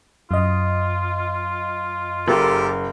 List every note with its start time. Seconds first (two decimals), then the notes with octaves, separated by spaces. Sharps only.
0.31 F#2 F4 D#5
2.28 F#1 G4 A4 A#4